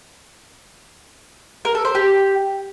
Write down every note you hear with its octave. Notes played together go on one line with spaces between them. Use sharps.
A#4
A4
C5
G4